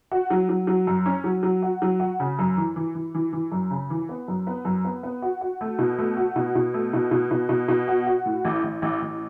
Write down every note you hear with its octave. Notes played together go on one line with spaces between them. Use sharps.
F#4
F#3
F#3
F#3
F#2
C#4
F#3
F#3
F#4
F#3
F#4
C#3
F#2
E3
E3
E3
E3
E3
F#2
C#3
E3
B3
F#2
B3
F#2
B3
B3
F#4
F#4
A3
B2
A3
F#4
B2
B2
A3
B2
B2
B2
B2
B2
F#4
F#4
A2
A1
A1
A1
A1